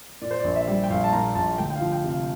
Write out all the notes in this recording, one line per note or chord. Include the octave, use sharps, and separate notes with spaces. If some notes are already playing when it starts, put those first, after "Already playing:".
A#2 D5
C5
D5
A#1
E5
G3
G5
A#1 F5
A5
A#2 A#5
A#1 A5
D2 G5
G5
F5
F3
G5
C3
F5